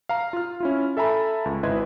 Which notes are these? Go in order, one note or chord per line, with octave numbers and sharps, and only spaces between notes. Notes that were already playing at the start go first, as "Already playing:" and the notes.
F5 A#5
F4 F6
C#4 E4 F4
A4 E5 G#5 A#5 B5
C#2
G#1 E4 B4 D#5 C6 G#6